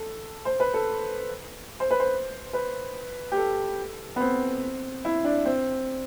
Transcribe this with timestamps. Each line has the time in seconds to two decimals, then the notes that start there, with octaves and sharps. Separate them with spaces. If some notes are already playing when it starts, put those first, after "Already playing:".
Already playing: A4
0.45 C5
0.60 B4
0.74 A4
1.80 C5
1.91 B4
2.00 C5
2.53 B4
3.32 G4
3.37 A4
4.16 B3
4.20 C4
5.05 E4
5.24 D4
5.45 C4